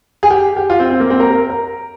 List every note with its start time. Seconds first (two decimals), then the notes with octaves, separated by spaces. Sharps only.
0.23 G#4
0.30 G4
0.57 G4
0.70 F4
0.80 C4
0.90 C4
1.00 A#3
1.10 C4
1.20 A#4
1.31 A#4
1.50 A#4